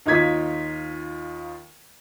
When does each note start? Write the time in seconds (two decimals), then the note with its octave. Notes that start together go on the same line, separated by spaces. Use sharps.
0.06 D#2 D#4 F4 G#6 B6